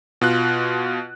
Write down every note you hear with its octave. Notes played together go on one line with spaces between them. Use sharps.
B2 F4 F#6